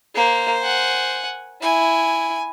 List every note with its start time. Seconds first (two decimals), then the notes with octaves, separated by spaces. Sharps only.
0.15 A#3 C5
0.62 F#5 G#5
1.62 E4 G#5